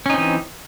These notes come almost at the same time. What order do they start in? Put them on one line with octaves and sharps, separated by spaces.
C#4 D#4 C4 E3